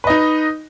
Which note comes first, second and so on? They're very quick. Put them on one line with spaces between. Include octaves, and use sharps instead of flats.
B4 D#5 D#4